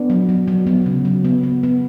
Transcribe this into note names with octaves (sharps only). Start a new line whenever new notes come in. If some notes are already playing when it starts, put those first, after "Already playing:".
Already playing: B3 D4
F#3
F#3
F#3
F#3 B3
C#3
F#3
B3
B3
B3